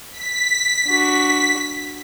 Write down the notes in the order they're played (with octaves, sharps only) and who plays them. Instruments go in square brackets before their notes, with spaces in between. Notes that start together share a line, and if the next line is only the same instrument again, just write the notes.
[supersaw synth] B6
[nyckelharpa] D4 F#4